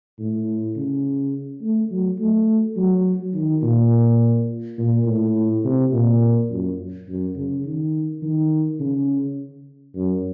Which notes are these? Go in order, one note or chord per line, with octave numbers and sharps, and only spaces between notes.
A2
C#3
A3
F#3
A3
F#3
D#3
A#2
A#2
A2
C3
A#2
F#2
F#2
C#3
D#3
D#3
C#3
F#2